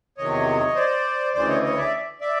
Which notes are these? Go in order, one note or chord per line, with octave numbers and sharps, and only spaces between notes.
E2 C3 D#3 F#3 C#5 D#5
C5 D5
D2 C#3 E3 C5 D5
C#5 D#5
C#5 D#5
D5 E5
D5 E5